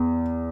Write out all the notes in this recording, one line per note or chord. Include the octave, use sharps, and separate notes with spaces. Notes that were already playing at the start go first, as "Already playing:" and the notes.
Already playing: E2